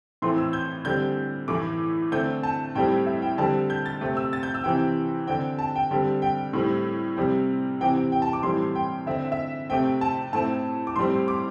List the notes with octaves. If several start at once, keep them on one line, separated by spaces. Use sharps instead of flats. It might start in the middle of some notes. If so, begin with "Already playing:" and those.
A2 E3 A3 C4 C6
E6
G6
D3 G3 C4 G6
A2 E3 A3 D6
D3 A3 C4 G6
A5
A2 G3 C4 G5
E5
G5
D3 G3 C4 A5
G6
A6
C3 A3 C4
E6
A6
G6
E6
C3 E3 C4 G5
D3 C4 G5
A5
G5
D3 G3 C4
G5
A2 G3 C4
C3 G3 C4
C3 E3 C4 G5
G5
G5
A5
D6
A2 E3 G3 C4 C6
G5
D3 C4 E5
E5
C3 A3 C4 G5
A5
A2 A3 C4 A5
D6
A2 G3 C4 C6
D6